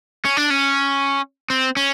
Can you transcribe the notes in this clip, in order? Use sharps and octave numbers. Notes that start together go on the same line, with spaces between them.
C#4
D4
C#4
C4
C#4